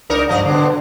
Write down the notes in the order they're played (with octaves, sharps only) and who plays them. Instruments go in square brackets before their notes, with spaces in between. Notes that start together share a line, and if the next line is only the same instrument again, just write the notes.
[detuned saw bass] C#2 [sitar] D4 D#4 A#4
[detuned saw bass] G2 [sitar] F3 D#5
[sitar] B2 D4 [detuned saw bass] D3